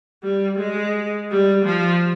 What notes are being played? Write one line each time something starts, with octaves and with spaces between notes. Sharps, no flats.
G3
G#3
G3
F3